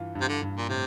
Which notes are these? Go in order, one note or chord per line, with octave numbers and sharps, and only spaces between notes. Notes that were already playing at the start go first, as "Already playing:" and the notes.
Already playing: G2 E3 F4
G2
C3
D3
G2
A#2
A2 C3